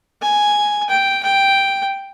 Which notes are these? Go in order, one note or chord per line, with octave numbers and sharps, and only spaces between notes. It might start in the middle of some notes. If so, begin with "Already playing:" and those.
G#5
G5
G5